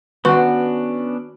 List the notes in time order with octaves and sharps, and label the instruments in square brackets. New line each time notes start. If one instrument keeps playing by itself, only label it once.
[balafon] D#3 B4 C#6 [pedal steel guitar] B3 C#4 D4 [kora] F#4